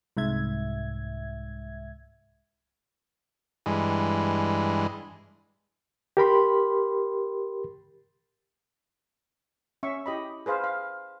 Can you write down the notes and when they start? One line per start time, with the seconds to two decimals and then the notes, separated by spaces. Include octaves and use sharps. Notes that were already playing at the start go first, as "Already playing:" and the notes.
0.17 C2 G#2 E5 G#6
3.66 G2 E3 G#3
6.17 G4 A#4 B5 C6
9.83 C#4 E5 C#6
10.06 E4 G4 D#5 B5
10.46 G#4 B4 C5 F5
10.64 F5